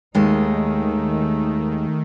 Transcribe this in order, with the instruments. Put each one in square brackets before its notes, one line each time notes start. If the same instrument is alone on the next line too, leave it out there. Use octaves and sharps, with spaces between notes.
[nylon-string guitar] D#2 G#3 [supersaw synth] D#3 [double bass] A3 D#4